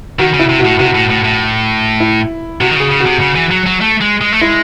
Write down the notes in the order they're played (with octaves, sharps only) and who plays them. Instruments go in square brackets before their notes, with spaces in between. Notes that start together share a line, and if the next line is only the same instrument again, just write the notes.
[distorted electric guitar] D#3 [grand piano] F#4
[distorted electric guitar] C#3
[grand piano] E4
[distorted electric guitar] C3
[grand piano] F#4
[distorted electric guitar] A2
[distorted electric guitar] C3 [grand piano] F#4
[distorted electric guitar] A2
A2
A2
[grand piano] E4
[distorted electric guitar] C3 [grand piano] F#4
[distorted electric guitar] D#3
[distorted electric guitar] C#3 [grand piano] G#4
[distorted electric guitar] C#3
[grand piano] F#4
[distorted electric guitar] C3
C#3
E3
F#3
F#3
A3
G#3
G#3
A3
[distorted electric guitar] G#3 [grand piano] E4